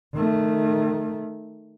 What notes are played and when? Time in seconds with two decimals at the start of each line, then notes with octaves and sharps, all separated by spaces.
0.14 D#3 A3